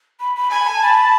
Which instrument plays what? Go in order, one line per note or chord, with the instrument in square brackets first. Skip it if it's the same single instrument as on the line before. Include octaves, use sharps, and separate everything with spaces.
[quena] B5
B5
[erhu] G#5 [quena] B5
[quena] A5
[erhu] A5 [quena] B5